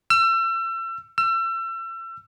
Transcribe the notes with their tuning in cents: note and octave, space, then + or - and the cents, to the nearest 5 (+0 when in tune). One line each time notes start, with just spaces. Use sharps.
E6 +35
E6 +35